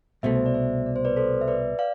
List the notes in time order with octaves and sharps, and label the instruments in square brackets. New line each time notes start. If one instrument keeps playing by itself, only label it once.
[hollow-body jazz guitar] C2 B2 A3 [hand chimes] C5 E5
[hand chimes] C5
D5
C5 E5
D5
C5
B4 D5
A4 C5
E5
B4 D5
D5 F5